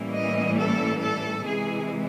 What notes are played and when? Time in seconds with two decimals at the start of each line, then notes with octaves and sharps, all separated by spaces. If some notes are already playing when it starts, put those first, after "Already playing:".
Already playing: A2 E3 G3 A#3 C#4
0.14 D#5
0.57 A4
1.01 A4
1.45 C3 E3 G#3 G#4